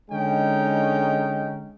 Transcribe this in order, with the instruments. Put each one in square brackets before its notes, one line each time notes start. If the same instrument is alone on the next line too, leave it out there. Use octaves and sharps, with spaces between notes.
[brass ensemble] D3 G#3 C#4 D#4 G5